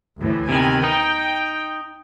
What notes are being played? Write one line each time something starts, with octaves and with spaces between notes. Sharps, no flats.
D2 A2 E3
C3 D#3 B3 G#5
D#4 G5